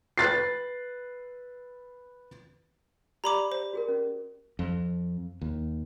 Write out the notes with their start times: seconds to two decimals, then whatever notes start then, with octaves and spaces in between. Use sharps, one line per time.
0.18 B4 F#6 A6 C7
3.24 G4 D5 A#5 B5 D6
3.52 C5
3.73 F#4 G#4 A#4
3.88 C#4
4.59 F2
5.41 D#2